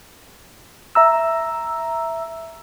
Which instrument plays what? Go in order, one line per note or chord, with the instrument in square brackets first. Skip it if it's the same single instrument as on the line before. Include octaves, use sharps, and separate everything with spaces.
[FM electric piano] E5 A#5 E6